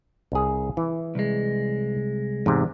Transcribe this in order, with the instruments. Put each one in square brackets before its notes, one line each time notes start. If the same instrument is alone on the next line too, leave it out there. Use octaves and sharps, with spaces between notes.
[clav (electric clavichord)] C2 G#4
E3
[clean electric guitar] C2 G#3
[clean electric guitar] E2 [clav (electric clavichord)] G#2 C3